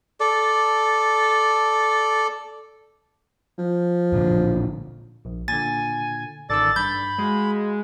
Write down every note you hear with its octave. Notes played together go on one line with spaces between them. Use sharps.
A4 D5
F3
A1 A#2 D3
A#1
A#2 D3 G#5 A6
A1 D#3 A4 D5 E6 A6
G2 B5 G6
G#3 F#4 F5